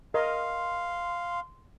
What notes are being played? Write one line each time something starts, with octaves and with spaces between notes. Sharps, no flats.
A#4 D#5 F5 C6